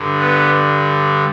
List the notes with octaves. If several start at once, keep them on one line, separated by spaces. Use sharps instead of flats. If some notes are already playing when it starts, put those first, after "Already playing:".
Already playing: G2 D3
B3